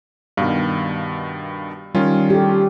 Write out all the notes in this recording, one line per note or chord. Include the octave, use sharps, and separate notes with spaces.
G2 B2 D#3 F5
D#3 G3 C#4 F4
G4 A4